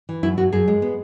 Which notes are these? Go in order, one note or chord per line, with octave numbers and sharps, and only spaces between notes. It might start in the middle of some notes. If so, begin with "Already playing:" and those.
E3
F#2 E4
F#2 F#4
F#2 G#4
G#3
B3